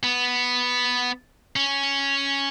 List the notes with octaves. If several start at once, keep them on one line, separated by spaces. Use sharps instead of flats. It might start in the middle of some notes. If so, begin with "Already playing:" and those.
B3
C#4